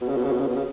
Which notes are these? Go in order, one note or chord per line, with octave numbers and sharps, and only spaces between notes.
B2
C#3
B2
C#3
B2
C#3
B2
C#3